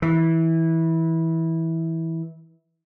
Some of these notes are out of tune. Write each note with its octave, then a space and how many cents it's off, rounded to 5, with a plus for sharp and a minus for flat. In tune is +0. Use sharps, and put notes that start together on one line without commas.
E3 -15